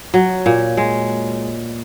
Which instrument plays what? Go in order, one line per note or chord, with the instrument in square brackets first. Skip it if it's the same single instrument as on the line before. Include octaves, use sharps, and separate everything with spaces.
[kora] F#3
A#2
G#3